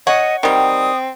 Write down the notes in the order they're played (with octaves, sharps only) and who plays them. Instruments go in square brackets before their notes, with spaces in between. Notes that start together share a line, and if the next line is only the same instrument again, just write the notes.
[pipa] C#5 [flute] D#5 [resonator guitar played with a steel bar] F#5
[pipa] D#3 G3 [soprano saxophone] C4 [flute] D#6